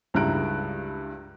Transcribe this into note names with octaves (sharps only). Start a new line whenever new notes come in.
C#2 G2 E4 A#5 F#6 D7